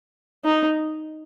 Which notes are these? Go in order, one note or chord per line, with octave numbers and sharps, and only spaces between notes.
D#4